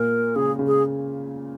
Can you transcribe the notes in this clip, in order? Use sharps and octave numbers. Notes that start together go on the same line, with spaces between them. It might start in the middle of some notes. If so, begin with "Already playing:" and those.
Already playing: A#2 A#4
C#3 G#4
C#3
G#4